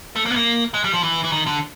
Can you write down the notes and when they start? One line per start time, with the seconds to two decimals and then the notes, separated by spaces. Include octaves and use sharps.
0.16 A3
0.26 A#3
0.31 B3
0.36 A#3
0.74 G#3
0.84 G3
0.93 F3
1.03 E3
1.24 E3
1.32 D#3
1.46 D3